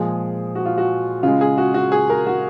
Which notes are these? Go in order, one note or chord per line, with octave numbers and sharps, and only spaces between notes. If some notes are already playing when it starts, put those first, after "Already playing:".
Already playing: A#2 F3 G#3 G#4
F#4
F4
F#4
C#3 G#3 F4
G#4
F#4
F#4
G#4
A#4
F#4